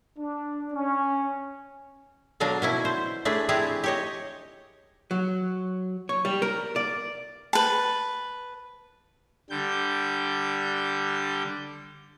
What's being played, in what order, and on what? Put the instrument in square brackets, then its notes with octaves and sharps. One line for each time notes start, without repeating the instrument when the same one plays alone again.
[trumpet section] D4
C#4
[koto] B2 D3 F#3 D4 F5 A#5
B2 C#4 E4
C5
A3 D4 G#4 B4
C4 D4 E4 G4 G#4
G4 C#5 D#5
[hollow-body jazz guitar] F#3
C#5
G3
A#4
D5
[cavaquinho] B4 A5
[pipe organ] D3 G3 G6